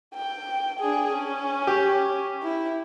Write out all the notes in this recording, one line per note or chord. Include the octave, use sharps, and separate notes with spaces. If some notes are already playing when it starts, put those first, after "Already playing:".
G5
D4 G#4
C#4
G4
E4